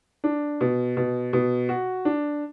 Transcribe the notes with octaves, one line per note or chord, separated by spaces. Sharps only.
D4
B2
B2
B2
F#4
D4